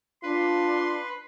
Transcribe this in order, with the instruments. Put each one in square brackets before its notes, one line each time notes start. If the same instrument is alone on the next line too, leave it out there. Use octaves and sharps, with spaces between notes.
[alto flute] D4 [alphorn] F4 [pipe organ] B4 [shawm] C6